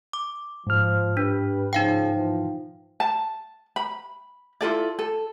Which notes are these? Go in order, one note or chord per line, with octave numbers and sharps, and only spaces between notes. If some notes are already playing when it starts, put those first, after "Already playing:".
D6
G#2 F3 F6
D4 G4 B4
C#3 F3 D#4 F5 G5
E3 F3
A5
B5
E4 F4 A4 D5
A4